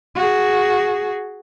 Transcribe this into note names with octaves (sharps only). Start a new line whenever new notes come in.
F#4 G#4